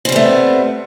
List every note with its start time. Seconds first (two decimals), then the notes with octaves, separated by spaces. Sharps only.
0.05 C4
0.09 G3
0.12 B3
0.16 A3